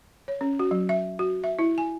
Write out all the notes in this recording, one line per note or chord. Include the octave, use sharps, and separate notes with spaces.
C#5
C#4
F#4
F#3
E5
F#4
E5
E4
G#5